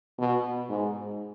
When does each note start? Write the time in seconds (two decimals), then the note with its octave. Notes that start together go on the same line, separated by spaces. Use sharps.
0.18 B2
0.69 G#2